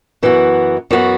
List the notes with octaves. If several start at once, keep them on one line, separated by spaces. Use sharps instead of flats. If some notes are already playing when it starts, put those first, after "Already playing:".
F#2 E3 B3 F#4
F#2 E3 B3 F#4